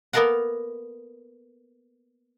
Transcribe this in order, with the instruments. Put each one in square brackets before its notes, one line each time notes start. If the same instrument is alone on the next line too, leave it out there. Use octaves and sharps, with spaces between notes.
[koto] A#3 B3 A4 A#4 F5 F#5